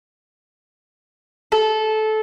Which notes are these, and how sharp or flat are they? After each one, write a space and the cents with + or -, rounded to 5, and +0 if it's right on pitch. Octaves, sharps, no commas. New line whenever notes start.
A4 -20